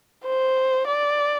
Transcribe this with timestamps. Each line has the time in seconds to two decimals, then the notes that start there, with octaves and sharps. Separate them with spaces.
0.25 C5
0.87 D5